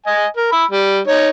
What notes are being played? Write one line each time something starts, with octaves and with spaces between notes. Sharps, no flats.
D#5 G#5
A#4
B5 E6
G3
D#4 C#5